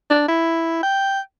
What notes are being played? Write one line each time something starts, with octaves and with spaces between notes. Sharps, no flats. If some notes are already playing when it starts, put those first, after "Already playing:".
D4
E4
G5